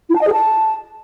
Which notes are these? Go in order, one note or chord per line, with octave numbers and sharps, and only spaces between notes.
E4
A5
D#5
G#4
A5